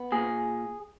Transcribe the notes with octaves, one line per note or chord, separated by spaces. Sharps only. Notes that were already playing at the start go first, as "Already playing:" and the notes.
Already playing: B3
A#2 G#4